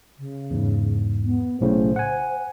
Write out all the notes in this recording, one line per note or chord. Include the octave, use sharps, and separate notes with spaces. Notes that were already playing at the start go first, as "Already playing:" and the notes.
C#3
E2 G#2
B3
B1 A2 C#3 C5
F#5 G#5